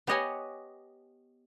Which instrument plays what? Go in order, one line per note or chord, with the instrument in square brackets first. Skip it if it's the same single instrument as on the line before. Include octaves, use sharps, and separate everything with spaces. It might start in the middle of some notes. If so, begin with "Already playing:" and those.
[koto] B3 G4 C#5 D#5 F#5 G#5